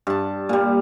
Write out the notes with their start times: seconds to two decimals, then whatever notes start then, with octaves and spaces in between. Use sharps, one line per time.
0.07 G2 A5
0.49 A#2 G3